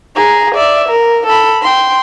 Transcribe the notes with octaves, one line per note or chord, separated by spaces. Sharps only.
G#4 A#5
D5 E5
A#4
A4 B5
G5 C6